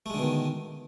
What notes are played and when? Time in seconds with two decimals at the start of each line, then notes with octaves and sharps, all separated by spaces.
0.06 A3
0.10 G#3
0.14 D3
0.18 B2
0.23 D#3